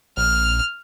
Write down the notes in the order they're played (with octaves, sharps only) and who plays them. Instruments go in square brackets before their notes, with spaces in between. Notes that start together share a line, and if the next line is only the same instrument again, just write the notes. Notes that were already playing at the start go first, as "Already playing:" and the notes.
[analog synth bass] A#1 [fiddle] F6